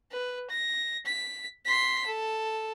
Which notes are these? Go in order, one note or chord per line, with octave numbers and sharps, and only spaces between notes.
B4
A#6
B6
C6 B6
A4